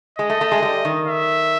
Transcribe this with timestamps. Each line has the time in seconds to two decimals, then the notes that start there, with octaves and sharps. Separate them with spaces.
0.19 G#3 D#5
0.30 A3
0.41 A3
0.52 G#3
0.62 G3
0.85 D#3
1.07 E5